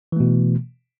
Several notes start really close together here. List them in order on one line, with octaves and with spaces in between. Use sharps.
E3 A3 B2